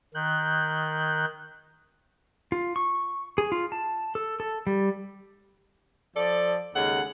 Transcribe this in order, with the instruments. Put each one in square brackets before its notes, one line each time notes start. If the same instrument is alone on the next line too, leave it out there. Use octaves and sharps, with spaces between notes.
[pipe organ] D#3 F#6 G6
[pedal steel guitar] F4
C#6
G#4
F4
A5
A4
A4
G3
[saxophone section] F3 A4 D5
D#2 C#3 G#3 A4 F#5